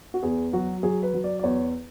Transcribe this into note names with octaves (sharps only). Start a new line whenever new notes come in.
F#4
E2 G#4
F#3 F#4
F#3 G#4
B4
F#3
D5
D5
E2 C#5